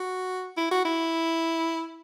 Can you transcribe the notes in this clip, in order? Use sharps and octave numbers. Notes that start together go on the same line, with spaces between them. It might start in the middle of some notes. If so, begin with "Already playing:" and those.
Already playing: F#4
E4
F#4
E4